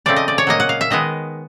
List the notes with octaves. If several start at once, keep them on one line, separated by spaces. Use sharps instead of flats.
C#3 F3 A3 C4 D5
D#5
D5
C#5
A#2 F#3 A#3 D#5
F#5
F5
E5
D#3 G#3 B3 D#5